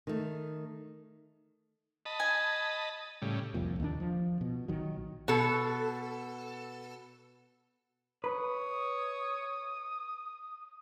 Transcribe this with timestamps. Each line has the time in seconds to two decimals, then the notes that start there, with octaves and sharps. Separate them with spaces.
0.07 D#3 A3
2.06 D#5 A5 B5
2.20 G#5
3.22 A2 C#3 G3
3.54 D1 C2 F2 A#2
3.80 D#2 D#3 C#4 D4
4.00 F3
4.41 B2
4.68 A#1 D#3 F#3
5.28 B2 A4
8.24 B4 C#5 D#6